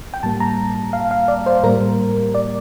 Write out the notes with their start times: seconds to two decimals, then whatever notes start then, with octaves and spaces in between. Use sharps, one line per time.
0.14 G5
0.23 A2 G3 A#3 A5
0.40 A#5
0.93 F5
1.11 F5
1.28 D5
1.46 C5
1.63 A2 G3 A#3 A#4
2.35 D5